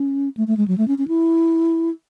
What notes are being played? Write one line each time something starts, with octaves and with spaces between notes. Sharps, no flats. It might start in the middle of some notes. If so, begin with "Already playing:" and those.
Already playing: C#4
A3
A3
G#3
F#3
A3
C#4
C#4
E4